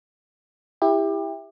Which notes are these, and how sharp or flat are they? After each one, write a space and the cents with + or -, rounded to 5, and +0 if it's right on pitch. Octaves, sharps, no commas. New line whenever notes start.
E4 +0 G4 +25